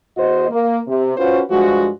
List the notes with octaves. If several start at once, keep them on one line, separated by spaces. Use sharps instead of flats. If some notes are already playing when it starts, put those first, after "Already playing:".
E2 F#4 C5 D#5
A#3
C3
C#4 F4 F#4 B4 C5
G2 F3 G#3 F#4